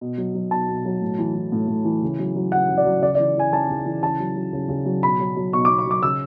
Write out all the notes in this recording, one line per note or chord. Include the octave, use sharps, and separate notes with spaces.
B2
F#3
F#3
B2 A5
B2
F#3
A2
E3
E3
A2
A2
E3
C#3
F#3
F#3
C#3 F#5
C#3
D5
F#3
C#3 D5
D5
E3
E3 G#5
C#3 A5
C#3
E3
C#3 A5
F#3
F#3
C#3
C#3
F#3
B2 B5
F#3
F#3
B2 C#6
D6
B2
C#6
F#3 D6
C#3 E6